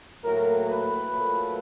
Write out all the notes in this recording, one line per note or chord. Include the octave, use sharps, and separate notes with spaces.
A2 F#3 A#3 A#4
B4
A#2 F#3 A3